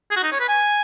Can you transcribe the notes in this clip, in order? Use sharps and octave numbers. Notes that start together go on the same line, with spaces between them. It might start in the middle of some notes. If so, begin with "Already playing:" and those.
G#4
F#4
D#4
C#5
B4
G#5